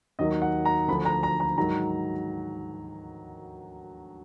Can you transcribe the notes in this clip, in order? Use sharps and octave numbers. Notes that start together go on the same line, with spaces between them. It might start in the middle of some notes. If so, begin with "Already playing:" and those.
D#2 D#3 F#3 D#5
F#5
A#5
D2 D3 F3 B5
A#5
A#5
A#5
G#2 D#3 F#3 A#5